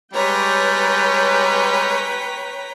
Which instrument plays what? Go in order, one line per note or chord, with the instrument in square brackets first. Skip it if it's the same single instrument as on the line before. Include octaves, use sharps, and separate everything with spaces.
[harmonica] G3 G#3 [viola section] B4 C#5 G5 [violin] A#5 B6